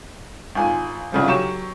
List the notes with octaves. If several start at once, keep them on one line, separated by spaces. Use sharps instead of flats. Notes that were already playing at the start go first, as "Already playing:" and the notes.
G#1 F4 G#5
C2 C#3 F3
F#3 G4 C#6 E7